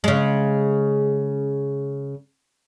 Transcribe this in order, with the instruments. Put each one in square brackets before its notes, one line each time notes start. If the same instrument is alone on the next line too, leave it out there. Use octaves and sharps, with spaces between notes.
[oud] C#3 G#3